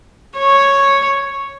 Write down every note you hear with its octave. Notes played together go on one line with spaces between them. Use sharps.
C#5